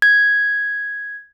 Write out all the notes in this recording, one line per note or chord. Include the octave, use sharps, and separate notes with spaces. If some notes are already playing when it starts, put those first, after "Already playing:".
G#6